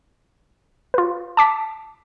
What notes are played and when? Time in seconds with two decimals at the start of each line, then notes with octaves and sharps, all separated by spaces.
0.94 F4 B4
1.37 A5 D6 B6